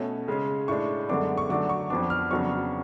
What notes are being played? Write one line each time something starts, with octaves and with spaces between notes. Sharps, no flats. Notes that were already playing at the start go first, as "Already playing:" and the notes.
Already playing: B2 A3 C#4
C#3 G#3 C#4
A2 G#3 D4 C#6
F#2 D3 G#3 B3 D4 D6
C#6
D3 F#3 A3 D4 D6
C#6
F2 F3 B3 D4 D6
F6
F2 C#3 F#3 B3 D4 C#6